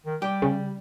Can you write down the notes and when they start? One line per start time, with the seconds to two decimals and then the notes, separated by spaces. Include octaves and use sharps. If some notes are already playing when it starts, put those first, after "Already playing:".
0.06 D#3
0.22 G3 G4
0.42 C#3